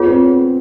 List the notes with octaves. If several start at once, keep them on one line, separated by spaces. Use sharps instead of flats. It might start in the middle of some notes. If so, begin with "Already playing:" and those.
Already playing: B3 F4 G#4 C#5
C4